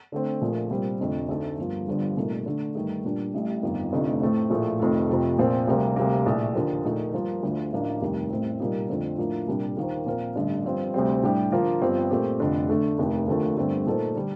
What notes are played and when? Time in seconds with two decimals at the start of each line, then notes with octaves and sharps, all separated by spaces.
0.12 D3 A3 C4
0.41 A#1 A#2 F3 A3
0.70 C2 A#2 G3 C4
1.00 F1 F2 D3 A3
1.29 D2 D3 A3 D#4 A4
1.58 G1 G2 F3 A#3
1.88 G1 G2 D3 F3
2.17 C2 A#2 A3 D#4
2.46 D3 A3 D4
2.75 G2 D#3 A3 D#4
3.05 A#2 G3 D4
3.34 A1 A2 G3
3.63 G1 F2 D#3 A#3
3.92 F1 F2 D3 A3 D#4
4.21 A2 A3 C4
4.50 A#1 A2 F3 A3
4.79 F1 F2 D#3 A3
5.09 F2 C3 F3 A3
5.38 A#1 A#2 F3 C4
5.67 D2 C3 G3 A#3
5.96 D2 C3 G3 A#3
6.26 A#1 A2 A3
6.55 D#2 D3 F3
6.84 A#1 A#2 A3 D#4
7.14 G2 F3 A#3
7.43 D2 D3 F3
7.72 A1 A2 F3 A#3 D4
8.01 F1 D#2 D#3 G3
8.30 A1 A2 G3 C4
8.60 C2 A#2 G3 A#3 D#4
8.89 F2 D3 F3 A3 C4
9.18 A2 F3 A#3 D4 F4
9.48 C2 A#2 G3 D4
9.77 D#2 D#3 A#3 F4 C5
10.06 A#2 F3 C4 F4 A#4
10.35 A1 G2 D3
10.64 G2 F3 C4 F4
10.94 D2 C3 G3 C4
11.23 A2 G3 D4 G4
11.52 D3 F3 A#3 F4
11.81 G1 G2 F3 C4
12.11 A#2 A3 C4 G4
12.40 F1 F2 D3
12.69 D3 A3 D4
12.98 F1 D#2 D#3
13.27 D#2 D3 F3 A3
13.57 G1 G2 D3 A3 C4
13.86 A#2 A3 D#4 A4 C5
14.15 D3 G3 D4